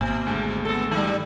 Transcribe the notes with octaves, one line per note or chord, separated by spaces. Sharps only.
G#1 B2 A#3
D2 G#3 A5
B3 A4
D#3 G3